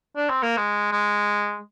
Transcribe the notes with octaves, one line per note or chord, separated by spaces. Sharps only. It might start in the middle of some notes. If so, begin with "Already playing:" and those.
D4
C4
A#3
G#3
G#3